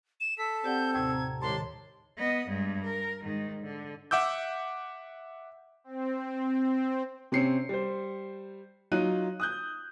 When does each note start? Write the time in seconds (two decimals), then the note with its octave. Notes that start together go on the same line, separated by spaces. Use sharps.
0.20 E7
0.38 A4 B6
0.64 C4 G4 D5 F#5 G6
0.94 D#2 A2 C3 G#6
1.10 A5 A#5
1.42 C2 A#2 D#3 G#3 G4 C#5 A5 C6
2.18 B3 D#5
2.49 G2 G#3
2.84 A#4
3.24 G#2 D#3
3.63 D3
4.11 E5 F#5 D6 E6 G6
5.84 C4
7.32 C3 C4 C#4 C7 C#7
7.69 G3 C5
8.92 F#3 D#4 F4 F#6 D#7
9.40 D#6 F#6 G6